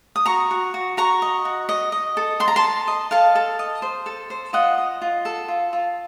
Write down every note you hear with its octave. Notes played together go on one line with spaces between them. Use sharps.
D#6
F#4 A#5 C#6
F#4
F#4
F#4 A#5 C#6
D#5
F#4
D#5
D#5
A4
A4 C6
A#5
A5 C6
A4
D#5
A4 F5 A5
A4
D#5
C5
A4
C5
F4 D#5 F#5
D#5
F4
A4
F4
F4